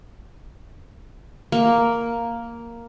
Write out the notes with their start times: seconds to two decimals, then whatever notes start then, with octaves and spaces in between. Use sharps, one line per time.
1.52 A#3